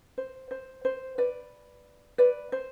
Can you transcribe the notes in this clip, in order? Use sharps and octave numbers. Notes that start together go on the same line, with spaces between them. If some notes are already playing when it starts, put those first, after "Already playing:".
C5
C5
C5
B4 D5
B4 D5
C5